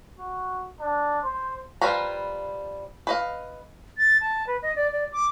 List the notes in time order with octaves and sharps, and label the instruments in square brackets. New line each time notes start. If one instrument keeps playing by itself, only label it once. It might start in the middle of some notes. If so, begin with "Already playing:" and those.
[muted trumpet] F#4
D4
C5
[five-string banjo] F3 G3 B4 F5 A#5
B4 D#5 F5
[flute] A6
A5
B4
D#5
D5
D5
D6